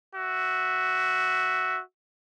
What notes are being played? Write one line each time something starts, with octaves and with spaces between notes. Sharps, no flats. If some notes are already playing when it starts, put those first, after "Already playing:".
F#4 E5